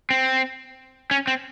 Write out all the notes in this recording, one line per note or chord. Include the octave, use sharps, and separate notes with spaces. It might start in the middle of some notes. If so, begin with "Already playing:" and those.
C4
C#4
C4